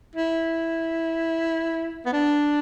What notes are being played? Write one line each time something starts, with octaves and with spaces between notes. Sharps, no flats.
E4
B3
D4